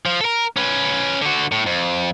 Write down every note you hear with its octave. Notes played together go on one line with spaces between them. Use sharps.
F3
A4 A#4
C#4 B4
D3 F#4
A2
F2